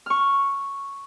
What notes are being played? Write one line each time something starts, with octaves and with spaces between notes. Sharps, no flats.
C#6 F6